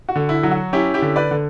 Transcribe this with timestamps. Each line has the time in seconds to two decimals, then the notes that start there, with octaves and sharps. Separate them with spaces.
0.09 F#4
0.16 D3
0.29 E4
0.43 F#3
0.51 F#4
0.73 C#4 E4 G4
0.94 E4 G4
1.02 D3
1.16 B4 D5
1.31 D3